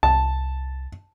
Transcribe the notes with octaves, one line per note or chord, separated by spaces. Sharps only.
C2 A5